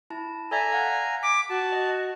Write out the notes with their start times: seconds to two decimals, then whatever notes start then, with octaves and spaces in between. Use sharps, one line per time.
0.10 E4 A5
0.51 A4 D5 E5 G#5 A#5
0.72 F5 F#5
1.23 D6 B6
1.49 F#4 A5
1.72 D#5